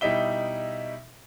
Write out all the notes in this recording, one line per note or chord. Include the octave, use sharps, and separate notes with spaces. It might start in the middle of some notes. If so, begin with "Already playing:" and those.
B2 G3 D#4 E4 E5 G7